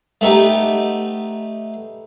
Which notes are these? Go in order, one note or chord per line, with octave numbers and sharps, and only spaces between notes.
A3 B3 D#4 G4